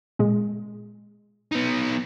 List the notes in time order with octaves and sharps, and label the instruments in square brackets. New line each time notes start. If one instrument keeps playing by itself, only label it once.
[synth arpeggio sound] A#2 G#3
[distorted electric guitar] B3 D#4